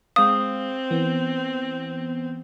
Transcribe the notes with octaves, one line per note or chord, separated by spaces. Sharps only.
G#3 C4 F5 D#6
E3 B3